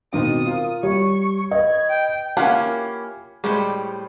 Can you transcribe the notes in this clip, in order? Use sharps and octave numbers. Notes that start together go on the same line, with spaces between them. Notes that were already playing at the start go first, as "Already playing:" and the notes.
B2 D#3 C4 D#6
F4 A#4
G3 C#5 C#6
B4 D#5 G#6
G5
A#3 C#4 E4 F4 G4 F#5 G#5 F6
A2 G3 G#3 G4 C5